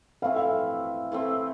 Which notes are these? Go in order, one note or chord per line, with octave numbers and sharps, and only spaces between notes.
E3 A3 C4 E4 F5
F5
E3 A3 C4 E4